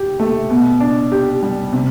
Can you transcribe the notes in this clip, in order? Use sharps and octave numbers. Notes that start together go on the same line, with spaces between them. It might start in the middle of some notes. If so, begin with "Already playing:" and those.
Already playing: G4
A3
B2
D4
G4
G3
C3